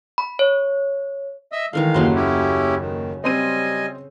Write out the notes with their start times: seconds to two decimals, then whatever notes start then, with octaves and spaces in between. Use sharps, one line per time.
0.18 B5
0.39 C#5
1.52 D#5 E5 E6
1.73 D#3 E3 G#3 A3 F5
1.94 F#1 D#2 C#3 F#3 C6
2.15 C#4 E4 G4
2.79 D#3
3.24 G3 C4 C5 D#5 G#5 D#7